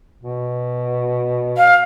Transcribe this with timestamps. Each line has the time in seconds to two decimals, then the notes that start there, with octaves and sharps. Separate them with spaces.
0.23 B2
1.57 F5